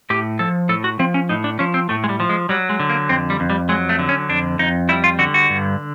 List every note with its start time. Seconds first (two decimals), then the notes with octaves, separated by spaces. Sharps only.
0.10 A2 G4
0.39 F3 A4
0.69 A2 A4
0.84 F#4
0.99 F3 C4
1.14 C#4
1.29 A2 D#4
1.44 D4
1.59 F3 C#4
1.74 C4
1.89 A2 A3
2.04 G#3
2.09 G3
2.20 F3
2.29 G#3
2.49 F#3 G3
2.69 G#3
2.80 D3
2.90 A#3
3.09 F2 C4
3.30 G3
3.40 F2
3.50 G3
3.69 F#3 G#3
3.89 A3
3.99 D3
4.09 C#4
4.29 F2 D4
4.59 F2 D#4
4.89 G3 E4
5.04 F4
5.19 D3 F#4
5.34 F#4
5.50 G2